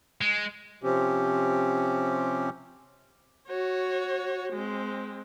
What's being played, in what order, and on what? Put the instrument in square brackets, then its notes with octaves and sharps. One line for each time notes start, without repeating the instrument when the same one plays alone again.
[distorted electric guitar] G#3
[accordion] C3 F3 C4 C#4 G4
[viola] F#4 C#5
G#3 C4